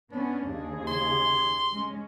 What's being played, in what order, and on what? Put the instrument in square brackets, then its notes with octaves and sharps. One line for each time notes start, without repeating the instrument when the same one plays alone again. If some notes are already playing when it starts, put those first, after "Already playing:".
[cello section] B3 C#4 [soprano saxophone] D4
[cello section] D#2 C#3 G#4
[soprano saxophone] C6
[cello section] G#3 C#4